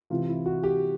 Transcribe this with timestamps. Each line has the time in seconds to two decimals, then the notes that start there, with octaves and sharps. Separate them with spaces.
0.10 C3 E3 F4
0.28 E4
0.46 F#4
0.63 G4